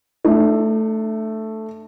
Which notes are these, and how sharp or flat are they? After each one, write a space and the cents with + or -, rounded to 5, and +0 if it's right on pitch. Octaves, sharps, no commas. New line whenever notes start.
A3 +0 D4 +40